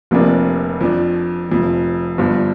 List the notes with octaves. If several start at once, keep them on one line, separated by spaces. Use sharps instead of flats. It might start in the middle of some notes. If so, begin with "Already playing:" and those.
F1 F2 C3 A#3 D4
F2 F3 D4
F1 F2 F3
G1 G2 F3